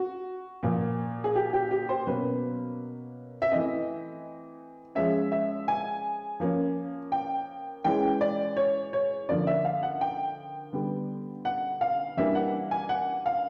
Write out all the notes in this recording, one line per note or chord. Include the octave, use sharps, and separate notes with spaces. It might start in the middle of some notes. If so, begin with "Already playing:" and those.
Already playing: F#4
A#2 F3 A#3
G#4
G4
G4
G4
C5
B2 F#3 A#3 C#4 B4
E5
E3 A3 C4 D#5
F3 G#3 C#4 E5
E5
G#5
F3 A#3 C#4
G5
E3 G#3 C#4 G5
D5
C#5
C#5
D3 F3 A#3 D5
E5
F5
F#5
G5
D3 G3 B3
F#5
F5
E3 G3 A#3 D4 E5
F#5
G#5
F#5
F5